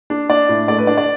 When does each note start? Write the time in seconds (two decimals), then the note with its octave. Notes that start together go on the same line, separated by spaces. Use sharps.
0.10 D4
0.30 D4 D5
0.49 A2
0.68 A3 D5
0.78 B4
0.87 D4 D5
0.98 D5